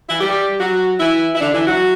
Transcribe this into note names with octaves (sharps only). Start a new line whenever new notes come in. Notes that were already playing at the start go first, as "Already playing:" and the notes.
E3 E4
G3 G4
F#3 F#4
E3 E4
E4
D3 D4
E3 E4
F#3 F#4